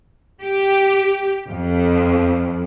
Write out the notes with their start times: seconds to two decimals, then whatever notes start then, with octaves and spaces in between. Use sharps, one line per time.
0.40 G4
1.48 F2